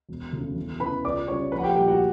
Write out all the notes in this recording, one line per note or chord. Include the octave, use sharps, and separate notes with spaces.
E1
D2 C#3
E2
C#3 E3 B4 B5
C#2 D5 D6
C#3 G3 C#5 C#6
A#1 B4 B5
F#5
G4 G5
A#2 G3 G4 G5
F#4 F#5